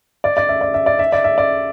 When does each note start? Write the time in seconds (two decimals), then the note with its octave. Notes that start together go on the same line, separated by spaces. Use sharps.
0.24 D5
0.37 D5
0.49 E5
0.61 D5
0.74 E5
0.86 D5
0.99 E5
1.12 D5
1.24 E5
1.38 D5